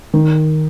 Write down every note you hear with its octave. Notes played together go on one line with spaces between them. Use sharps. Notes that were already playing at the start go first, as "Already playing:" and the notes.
D#3